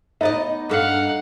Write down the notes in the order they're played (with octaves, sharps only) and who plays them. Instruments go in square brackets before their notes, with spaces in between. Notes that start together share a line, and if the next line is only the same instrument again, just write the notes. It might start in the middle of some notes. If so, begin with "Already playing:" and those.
[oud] B3 D5 D#5 [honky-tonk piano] D#4
[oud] G2 A4 [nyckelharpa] F5 F#5